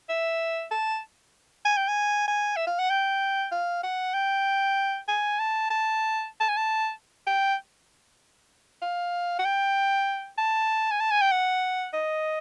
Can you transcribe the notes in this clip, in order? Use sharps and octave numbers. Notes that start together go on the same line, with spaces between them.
E5
A5
G#5
G5
G#5
G#5
E5
F5
F#5
G5
F5
F#5
G5
G#5
A5
A5
A5
G#5
A5
G5
F5
F#5
G5
A5
G#5
A5
G#5
G5
F#5
D#5